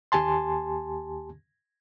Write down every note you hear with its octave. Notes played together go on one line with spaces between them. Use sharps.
D#2 G4 G#5 A5 C6